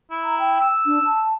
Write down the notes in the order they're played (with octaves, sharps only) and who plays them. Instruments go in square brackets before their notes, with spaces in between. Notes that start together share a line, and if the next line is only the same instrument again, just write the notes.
[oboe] E4
[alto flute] A#5
G5
[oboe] E6
[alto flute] D4
A5